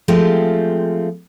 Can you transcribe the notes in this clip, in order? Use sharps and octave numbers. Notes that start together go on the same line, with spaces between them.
F3 G#3 A3 C4 F4 G4